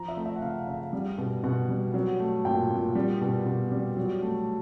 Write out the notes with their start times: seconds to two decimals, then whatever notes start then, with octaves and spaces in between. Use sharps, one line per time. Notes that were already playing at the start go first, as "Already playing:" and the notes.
Already playing: F3 A#5
0.08 E5
0.17 A3
0.26 E5
0.36 F#5
0.42 C#3 F5
0.68 C#3
0.93 G3
1.18 B2
1.43 B2 F#5
1.69 G3
1.94 F#3
2.20 A3
2.45 A#2 G5
2.70 A#2
2.95 G3
3.21 B2
3.46 B2
3.72 G3
3.97 F#3
4.22 A3